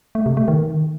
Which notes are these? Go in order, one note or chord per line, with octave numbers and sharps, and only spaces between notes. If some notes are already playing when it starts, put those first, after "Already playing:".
A3
C3
A3
D#3